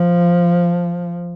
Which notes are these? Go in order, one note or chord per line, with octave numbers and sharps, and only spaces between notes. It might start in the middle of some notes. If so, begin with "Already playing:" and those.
Already playing: F3